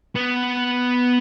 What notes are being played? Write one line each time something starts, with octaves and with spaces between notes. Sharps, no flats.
B3